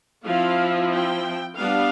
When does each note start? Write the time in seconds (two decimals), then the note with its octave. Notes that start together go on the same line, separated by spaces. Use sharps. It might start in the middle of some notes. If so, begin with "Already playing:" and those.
0.25 F3 C4 E4 F5
0.92 G5
1.57 G3 B3 D4 F5